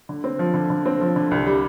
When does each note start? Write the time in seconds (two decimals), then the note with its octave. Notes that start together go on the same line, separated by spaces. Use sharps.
0.09 D3
0.24 C4
0.39 F3
0.54 D3
0.70 D3
0.85 C4
1.01 F3
1.16 D3
1.31 C2
1.47 G3